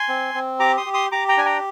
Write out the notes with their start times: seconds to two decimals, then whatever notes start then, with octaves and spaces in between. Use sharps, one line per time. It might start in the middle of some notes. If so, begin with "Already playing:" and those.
Already playing: G#5 C6
0.08 C4
0.34 C4
0.60 G4 A#5 D6
0.77 C6 D#6
0.86 G4
0.94 C6 D#6
1.12 G4 A#5 D6
1.28 G5 A#5
1.37 D4 G#5
1.45 G5 A#5